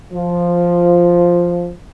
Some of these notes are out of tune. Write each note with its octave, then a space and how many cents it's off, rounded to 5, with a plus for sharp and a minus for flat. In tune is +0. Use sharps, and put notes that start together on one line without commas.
F3 +0